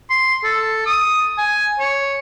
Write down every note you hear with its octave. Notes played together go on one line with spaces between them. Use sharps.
C6
A4
D#6
G#5
C#5